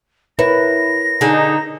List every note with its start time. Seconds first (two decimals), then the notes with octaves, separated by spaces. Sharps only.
0.39 E4 A#4 B4 C#5 A#6
1.21 D3 D#4 G#4